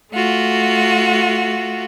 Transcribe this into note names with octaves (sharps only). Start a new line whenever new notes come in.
A3 F4 F#4